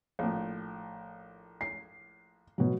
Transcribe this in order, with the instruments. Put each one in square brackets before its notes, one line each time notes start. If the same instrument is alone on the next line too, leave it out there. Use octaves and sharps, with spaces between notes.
[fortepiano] A#1 A2
[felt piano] C7
B2 F#3